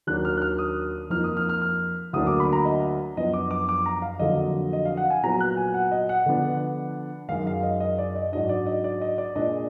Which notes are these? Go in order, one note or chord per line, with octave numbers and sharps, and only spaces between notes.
D#2 D#3 F#3 A#3 D4 F#6
F6
F#6
F6
D#6
F2 F3 A#3 D#4 F6
D#6
F6
F6
F6
D2 D3 F#3 A#3 D4 D#6
D6
B5
A#5
D#5
F#2 F3 B3 D4 D#5
D6
D6
D6
A#5
F5
F2 D3 F#3 A#3 D4 D#5
D#5
F5
F#5
G#5
A#2 F#3 B3 A#5
F#6
G#5
F#5
D#5
F#5
D3 F3 B3 D4
F#2 D#3 G#3 F5
F5
D#5
D#5
D5
D#5
G#2 F#3 D4 D#5
D5
D#5
D5
D#5
D5
A#2 G#3 D4 D#5